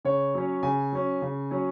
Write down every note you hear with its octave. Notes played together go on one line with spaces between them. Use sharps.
C#3 C#5
F#3 C#4
C#3 G#5
F#3 C#4
C#3
F#3 C#4